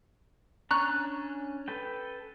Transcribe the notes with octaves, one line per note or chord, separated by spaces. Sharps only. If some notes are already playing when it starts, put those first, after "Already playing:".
C#4 D4 A#5 C#6 F#6
A4 B4 G5